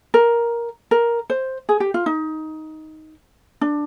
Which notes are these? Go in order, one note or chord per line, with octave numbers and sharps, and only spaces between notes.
A#4
A#4
C5
G#4
G4
F4
D#4
D4